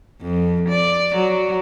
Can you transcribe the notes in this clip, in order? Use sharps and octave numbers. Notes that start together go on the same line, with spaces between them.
F2
D5
F#3